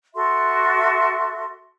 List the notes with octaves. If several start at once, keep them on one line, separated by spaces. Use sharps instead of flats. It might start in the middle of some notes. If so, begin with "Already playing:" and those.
F#4 A4 E5 C6